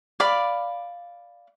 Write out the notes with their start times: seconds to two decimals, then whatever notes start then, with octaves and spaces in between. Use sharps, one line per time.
0.20 D5 F5 B5